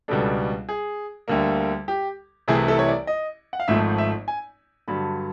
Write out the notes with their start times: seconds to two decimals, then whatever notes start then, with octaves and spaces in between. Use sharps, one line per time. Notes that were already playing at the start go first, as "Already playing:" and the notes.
0.08 C#2 B2 G3 B3 D4 A4
0.69 G#4
1.28 D2 D3 G3 A#3
1.88 G4
2.48 C2 C3 E3 A3 G#4
2.68 A4
2.79 C#5
2.88 D5
3.07 D#5
3.53 F#5
3.60 F5
3.68 G#1 G#2 F3 A3 E5
3.98 E5
4.28 G#5
4.88 G2 D3 F#3 B5